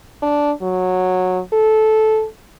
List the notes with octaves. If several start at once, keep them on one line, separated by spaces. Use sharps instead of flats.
D4
F#3
A4